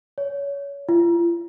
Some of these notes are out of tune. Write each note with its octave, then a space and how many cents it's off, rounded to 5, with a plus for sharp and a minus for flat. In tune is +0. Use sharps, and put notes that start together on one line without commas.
C#5 +25
F4 -40